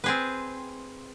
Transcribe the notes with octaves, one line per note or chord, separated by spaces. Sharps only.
C4 G#4 B4